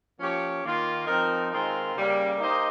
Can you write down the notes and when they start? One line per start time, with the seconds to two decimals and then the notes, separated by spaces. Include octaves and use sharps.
0.19 F3 A#3 C#4 G4 C#5
0.64 D#3 A#3 F4
1.06 F3 C4 D#4 A#4
1.50 D#3 G#3 C4 F4 A#4
1.95 C#3 G3 A#3
2.38 A#3 D#4 G4 C5 D#5